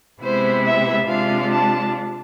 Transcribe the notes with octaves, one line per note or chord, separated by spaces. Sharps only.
C3 G#3 B3 E4 C5
E5
C3 G#3 D4 F4 F5
A5